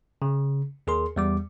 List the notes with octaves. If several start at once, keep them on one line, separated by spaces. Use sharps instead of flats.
C#3
D#2 G#4 A#4 C6
E2 G3 D6